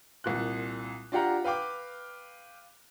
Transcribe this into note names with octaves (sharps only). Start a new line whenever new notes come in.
C2 A#2 F#6
D4 F4 G4 F#5 A#5
B4 F5 G5 D6